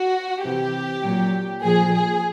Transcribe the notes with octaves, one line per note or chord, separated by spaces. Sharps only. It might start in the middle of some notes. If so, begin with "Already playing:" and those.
Already playing: F#4
C3 E3 G4
A#2 F#3
A#2 F3 G#4
G#4